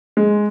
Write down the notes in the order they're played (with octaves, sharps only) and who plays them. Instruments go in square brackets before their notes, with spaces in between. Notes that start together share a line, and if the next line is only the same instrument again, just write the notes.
[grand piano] G#3